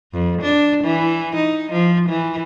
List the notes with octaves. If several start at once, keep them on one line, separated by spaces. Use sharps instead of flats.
F2
D4
E3
D#4
F3
E3